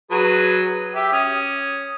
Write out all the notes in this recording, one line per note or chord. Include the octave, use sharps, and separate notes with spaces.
F#3 G#4 B4
G4 E5
C#4 D#6